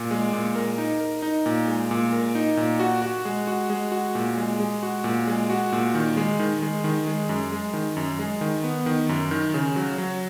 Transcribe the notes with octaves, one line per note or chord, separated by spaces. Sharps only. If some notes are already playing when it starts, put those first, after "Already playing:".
Already playing: A#2
G#3
A#2
A#4
D#4
A#4
D#4
A#2
G#3
A#2
A#4
D#4
A#2
F#4
F#4
G#3
F#4
G#3
F#4
A#2
G#3
G#3
F#4
A#2
G#3
F#4
A#2
D#3
G#3
D#3
G#3
D#3
G#3
F#2
G#3
D#3
F#2
G#3
D#3
B3
D#3
F#2
D#3
C#3
F#3
F#3